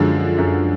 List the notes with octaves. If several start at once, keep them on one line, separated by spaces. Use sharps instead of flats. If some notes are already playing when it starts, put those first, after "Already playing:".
Already playing: F#2 D3 F3 G#3
F#2